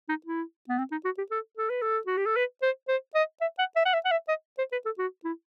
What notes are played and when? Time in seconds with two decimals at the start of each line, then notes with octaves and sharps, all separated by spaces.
0.09 D#4
0.26 E4
0.69 B3
0.78 C4
0.92 D#4
1.05 F#4
1.18 G4
1.31 A4
1.57 A4
1.70 B4
1.82 A4
2.07 F#4
2.17 G4
2.26 A4
2.36 B4
2.62 C5
2.88 C5
3.15 D#5
3.41 E5
3.59 F#5
3.76 E5
3.85 F#5
3.93 E5
4.05 F#5
4.11 E5
4.28 D#5
4.58 C5
4.72 B4
4.85 A4
4.98 F#4
5.24 E4